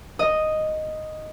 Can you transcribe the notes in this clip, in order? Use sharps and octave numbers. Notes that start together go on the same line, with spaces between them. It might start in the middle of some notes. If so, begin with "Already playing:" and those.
D#5